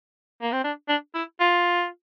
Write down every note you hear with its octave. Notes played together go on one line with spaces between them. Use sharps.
A#3
C4
D4
D4
E4
F4